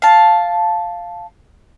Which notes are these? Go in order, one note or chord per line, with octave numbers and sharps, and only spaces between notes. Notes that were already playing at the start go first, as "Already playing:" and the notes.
F5 A5